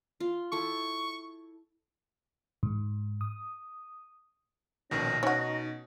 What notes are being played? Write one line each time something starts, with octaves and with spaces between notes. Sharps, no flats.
F4
E4 A4 C#6
G#2
D#6
A#1 B2 D#3 C#4 A#6
B2 C#4 D#4 F#4